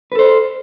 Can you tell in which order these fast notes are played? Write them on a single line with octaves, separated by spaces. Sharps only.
B4 A4 C5